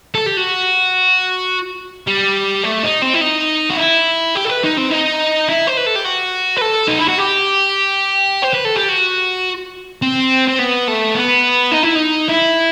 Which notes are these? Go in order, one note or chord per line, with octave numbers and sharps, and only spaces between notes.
A4
G4
F#4
G3
A3
D#4
C4
E4
D#4
F#4
E4
G4
A4
B4
D#4
C4
D#4
E4
C5
B4
A4
G4
F#4
B4
A4
D#4
E4
F#4
G4
C5
B4
A4
G4
F#4
C4
C4
B3
A3
B3
D#4
E4
D#4
E4